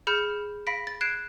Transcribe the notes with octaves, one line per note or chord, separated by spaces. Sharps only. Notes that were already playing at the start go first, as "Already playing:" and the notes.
G#4 B5 F6 G6 C#7 E7
F5 B5 A#6 B6 D7
A6
F#6 G#6 C7 D7 E7